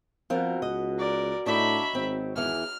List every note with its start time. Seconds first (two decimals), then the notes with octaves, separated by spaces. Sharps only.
0.30 B2 F3 C4 F4 A#4 F#5
0.62 C#2 D#5
0.99 A#4 D5
1.46 A2 D4 D#4 F#4 C#5 D5 E5 B5
1.95 G#1 C4
2.36 E2 E3 F6